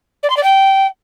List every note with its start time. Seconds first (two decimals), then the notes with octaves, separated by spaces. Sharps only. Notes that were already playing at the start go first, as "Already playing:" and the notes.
0.23 D5
0.30 C6
0.37 D5
0.43 G5